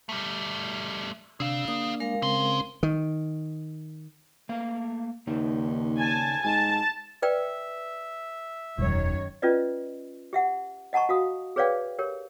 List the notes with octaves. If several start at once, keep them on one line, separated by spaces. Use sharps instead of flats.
G3 A3
C3 D4 G#4 F5 E6
A#3 D4 D#6
G#3 A#4 F5
C#3 C4 G#4 C6
D#3
A3 A#3 F5
D#2 C#3 D#4
G#5 A5
G#2 G#5 A5
B4 D5 E5 G5
E1 F#2 D#3 C#5
C#4 F4 B4 D5 D#5
G4 E5 F#5
D#5 F#5 A5 A#5 C#6
F#4 F5 D#6
G#4 B4 C#5 D5 F5 G5
G4 A#4 C#5